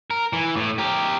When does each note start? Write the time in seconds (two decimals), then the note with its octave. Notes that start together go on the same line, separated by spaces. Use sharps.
0.11 A#4
0.33 E3
0.56 A2
0.78 G4 A#4